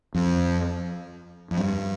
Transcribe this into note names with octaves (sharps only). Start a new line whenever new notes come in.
F2
F2
G2